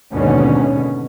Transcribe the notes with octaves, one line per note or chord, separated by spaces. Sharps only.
D#2 G#2 B2 D3 C#4